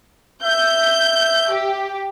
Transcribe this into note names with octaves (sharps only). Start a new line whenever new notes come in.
E5 G6
G4